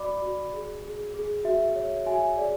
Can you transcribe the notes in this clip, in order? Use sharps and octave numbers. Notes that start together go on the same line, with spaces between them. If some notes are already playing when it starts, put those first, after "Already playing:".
Already playing: F#4 D5 B5 D6
F#4
G#4
G#4
G#4
F#4 E5
C#5
F#4 E5 G#5
G#4 D5